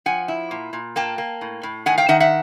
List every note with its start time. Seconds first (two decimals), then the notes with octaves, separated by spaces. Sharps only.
0.06 F3 F#5 G#5
0.28 E4
0.51 A#2
0.73 A#2
0.96 A#3 G5 A5
1.18 A#3
1.41 A2
1.63 A2
1.86 D#3 F#5 G#5
1.98 F5 G5
2.08 D#3 E5 F#5
2.20 E5 F#5